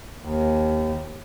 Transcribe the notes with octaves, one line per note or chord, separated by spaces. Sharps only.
D#2